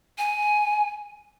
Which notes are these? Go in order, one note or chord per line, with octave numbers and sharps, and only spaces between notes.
G#5